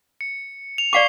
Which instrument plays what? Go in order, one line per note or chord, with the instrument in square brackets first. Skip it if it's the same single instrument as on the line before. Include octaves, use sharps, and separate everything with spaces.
[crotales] C#7
F7
[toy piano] D5 F5 D6 [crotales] C#6 C7 G7